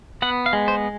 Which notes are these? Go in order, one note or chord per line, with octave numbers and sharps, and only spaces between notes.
B3 F#5
F5
G#3
C5